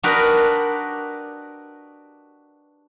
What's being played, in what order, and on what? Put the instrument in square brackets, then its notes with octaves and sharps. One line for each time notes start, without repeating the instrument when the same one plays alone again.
[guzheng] D4 F#4 G4 A#4 B4 D#5